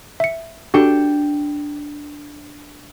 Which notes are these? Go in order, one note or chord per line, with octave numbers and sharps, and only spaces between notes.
E5 C#7
D4 F#4 G4 A4 G5 C#7